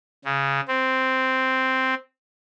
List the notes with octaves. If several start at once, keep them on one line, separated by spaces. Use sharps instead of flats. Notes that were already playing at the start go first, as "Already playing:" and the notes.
C#3
C4